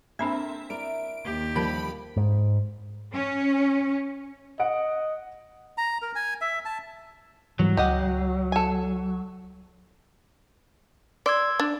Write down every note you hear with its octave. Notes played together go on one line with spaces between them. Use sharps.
A#3 C4 D4 A4 A#4 E5 B5
E4 A#4 D5 D7
D#2 G4
D3 F3 G3 A#4 B5 D7
G#2
C#4
D#5 F#5 D7
A#5
A#4
G#5
E5
A5
G#2 E3 F#3 G3
C#2 G4 D#5 F#5
A4 G#5
D5 C6 E6 G#6
D4